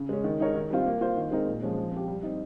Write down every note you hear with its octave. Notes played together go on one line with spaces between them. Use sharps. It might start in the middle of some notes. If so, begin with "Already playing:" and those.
Already playing: C#3
G#3 C#4
D#3
G#3 D#4 A#4 C#5
D#3
G3 C4 F4
A#3
F4 C5
D#3
G#3 C4 D#4 A#4
A#2
F3 G#3 C#4
F3
C4 G4
G3
C4 D#4